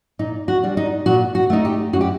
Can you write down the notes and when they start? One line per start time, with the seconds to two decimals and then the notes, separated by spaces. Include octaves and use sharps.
0.19 A#2 D#4
0.48 F#4
0.63 G3 D4
0.77 D#4
1.06 A#2 F#4
1.35 F#4
1.50 A3 D#4
1.65 G4
1.93 F#2 F#4
2.01 G4